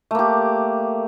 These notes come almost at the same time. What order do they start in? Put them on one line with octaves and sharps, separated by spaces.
A3 A#3 G4